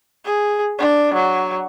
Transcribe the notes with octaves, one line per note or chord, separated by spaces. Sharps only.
G#4
D4
F#3